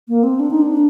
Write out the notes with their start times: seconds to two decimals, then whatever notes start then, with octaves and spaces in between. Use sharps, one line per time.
0.09 A#3
0.23 C4
0.40 D4
0.51 D#4
0.62 D4